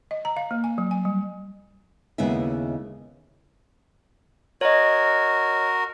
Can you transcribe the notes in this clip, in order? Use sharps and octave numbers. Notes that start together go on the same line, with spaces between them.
D#5
A#5
F5
A#3
G#5
F#3
G#5
G3
D#2 C#3 G#3 B3 E4 E5
F#4 A#4 C#5 D#5